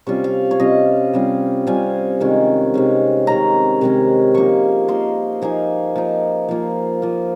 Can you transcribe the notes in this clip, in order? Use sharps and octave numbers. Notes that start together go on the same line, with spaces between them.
C3 G3 C#4 F4 C#6
F5
C#5
C3 G3 C#4 F4 D#5
C3 G3 C#4 F4
C3 G3 C#4 F4 G#5
C3 D#3 G#3 C#4
C3 D#3 G#3 C#4
C3 D#3 G#3 C#4 A#5
C3 D#3 G#3 C#4
F3 A#3 D#4 C#6
F3 A#3 D#4 C6
F3 A#3 D#4 G#5
F3 A#3 D#4
F3 A#3 F4
F3 A#3 F4